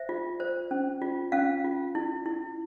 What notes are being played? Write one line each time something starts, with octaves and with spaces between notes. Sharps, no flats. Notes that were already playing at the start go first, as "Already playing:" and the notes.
Already playing: C5 E5
F4
C5
C#4
F4
C#4 F5
F4
E4
E4